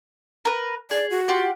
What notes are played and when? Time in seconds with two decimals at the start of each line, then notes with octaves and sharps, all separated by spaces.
0.45 A#4 B4
0.91 G#4 D5
1.10 F#4
1.28 F4 G4 F#5